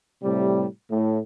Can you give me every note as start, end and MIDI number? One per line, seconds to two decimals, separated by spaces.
0.23 0.65 45
0.23 0.65 48
0.23 0.65 55
0.91 1.19 45